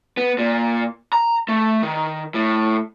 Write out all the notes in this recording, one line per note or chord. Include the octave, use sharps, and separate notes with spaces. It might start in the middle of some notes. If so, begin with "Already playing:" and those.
B3
A#2
A#5
A3
D#3
A2